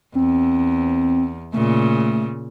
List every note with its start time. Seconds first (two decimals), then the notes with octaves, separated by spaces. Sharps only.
0.15 E2 C4
1.53 A#2 C#3 A3